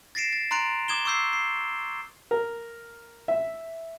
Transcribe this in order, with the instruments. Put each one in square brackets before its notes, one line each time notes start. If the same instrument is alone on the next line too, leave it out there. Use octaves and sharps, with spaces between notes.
[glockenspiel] A6 A#6 C7 D7 E7
A6
A#5 C6 F#6 A6 D7 F7
D6 D#6 G#6 E7 G7
C#6 D6 E6 G6 C7
C7
[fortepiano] A#4
E5